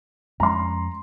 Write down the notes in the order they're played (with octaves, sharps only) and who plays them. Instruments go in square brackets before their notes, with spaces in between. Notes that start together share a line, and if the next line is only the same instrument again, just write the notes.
[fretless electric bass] F2 G#3 C#4 [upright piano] A#5 C6